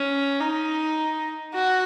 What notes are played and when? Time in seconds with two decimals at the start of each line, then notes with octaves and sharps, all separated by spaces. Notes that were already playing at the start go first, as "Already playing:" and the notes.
Already playing: C#4
0.40 D#4
1.54 F#4